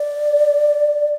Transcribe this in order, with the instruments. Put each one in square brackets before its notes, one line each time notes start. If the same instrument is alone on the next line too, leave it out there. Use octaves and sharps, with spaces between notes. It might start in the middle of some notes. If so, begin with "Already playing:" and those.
Already playing: [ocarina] D5